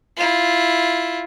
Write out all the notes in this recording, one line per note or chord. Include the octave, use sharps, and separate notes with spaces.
E4 F4